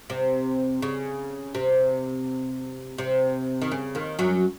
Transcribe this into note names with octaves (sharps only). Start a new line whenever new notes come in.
C3
C#3
C3
C3
D#3
C#3
D#2 D#3
F#2 F#3